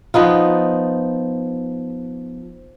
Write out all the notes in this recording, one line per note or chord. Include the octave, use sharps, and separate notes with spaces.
F3 B3 D#4 F4